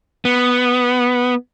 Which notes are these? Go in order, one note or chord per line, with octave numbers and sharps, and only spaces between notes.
B3